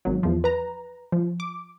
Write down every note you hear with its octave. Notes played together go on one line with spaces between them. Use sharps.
G#1 F#3
E2 F3
B4 A#5
F3
D6